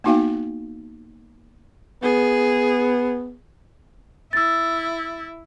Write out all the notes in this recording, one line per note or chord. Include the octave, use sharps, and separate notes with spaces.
A#3 B3 D#4 F#4 F5 G5
B3 G#4
E4 E6 A6